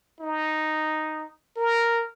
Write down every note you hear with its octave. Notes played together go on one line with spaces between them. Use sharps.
D#4
A#4